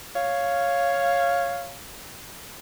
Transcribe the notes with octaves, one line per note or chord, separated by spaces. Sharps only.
C#5 F5